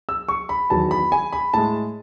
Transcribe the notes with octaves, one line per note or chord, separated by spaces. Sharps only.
E6
C#6
B5
E2 D#3 F#3 A5
B5
G#5
B5
A2 G#3 A5